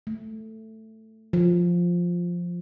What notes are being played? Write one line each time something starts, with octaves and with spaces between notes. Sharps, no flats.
A3
F3